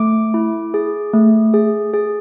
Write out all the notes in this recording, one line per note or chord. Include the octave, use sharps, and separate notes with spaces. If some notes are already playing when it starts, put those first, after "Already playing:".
Already playing: A3 D6
E4
G#4
A3
G#4
G#4